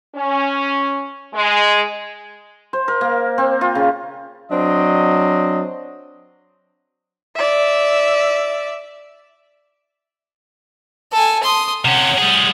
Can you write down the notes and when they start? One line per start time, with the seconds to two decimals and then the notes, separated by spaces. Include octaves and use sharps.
0.15 C#4
1.34 G#3
2.73 C5
2.88 A#4
3.01 A#3
3.38 C4
3.61 F4
3.75 C#3
4.52 F#3 C4 D4 D#5
7.35 D5 E5
11.12 A4 G#5
11.43 C6 D#6
11.85 C3 C#4 F#5
12.18 G3 G#4